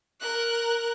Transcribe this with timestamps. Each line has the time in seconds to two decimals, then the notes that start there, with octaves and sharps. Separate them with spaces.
0.21 A#4 F#6